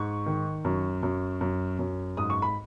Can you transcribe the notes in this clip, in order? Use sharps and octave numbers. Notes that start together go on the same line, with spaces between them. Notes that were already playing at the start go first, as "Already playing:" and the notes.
Already playing: G#2 C#6
D#3
F#2
F#2
F#2
F#2
G#2 D#6
C#6
B5